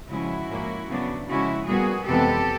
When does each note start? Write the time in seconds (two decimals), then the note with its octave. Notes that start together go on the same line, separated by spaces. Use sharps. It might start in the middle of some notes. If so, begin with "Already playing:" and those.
0.09 C#3 F3 G#3 C#4 E4 F#4
0.49 G#2 F3 A#3 C#4
0.88 C#3 F#3 B3 D4
1.28 C#3 F3 G#3 C#4 E4 F#4
1.67 A#2 G3 B3 F#4 G#4
2.07 F2 C3 E3 G#3 B3 G4 A4